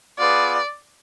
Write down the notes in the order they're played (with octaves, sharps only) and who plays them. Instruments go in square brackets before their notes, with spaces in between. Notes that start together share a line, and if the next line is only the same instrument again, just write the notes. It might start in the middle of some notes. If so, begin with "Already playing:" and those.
[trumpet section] B3 F4 G#4 B4 [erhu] D5